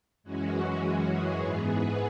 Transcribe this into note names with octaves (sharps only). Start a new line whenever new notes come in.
F#2 E3 G#3 C#4 F#4
F#4
G#4
G#2 E3 B3
B4